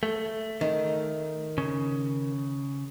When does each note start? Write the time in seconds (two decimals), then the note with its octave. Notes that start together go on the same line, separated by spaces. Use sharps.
0.03 A3
0.61 D#3
1.58 C#3